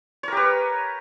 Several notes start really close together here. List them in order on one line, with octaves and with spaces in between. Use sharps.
C#5 A#4 G4 B4